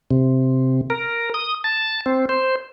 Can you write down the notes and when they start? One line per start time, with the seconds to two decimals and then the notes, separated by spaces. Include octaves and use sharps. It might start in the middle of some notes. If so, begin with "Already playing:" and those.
0.11 C3
0.90 A#4
1.34 D#6
1.64 A5
2.06 C4
2.29 C5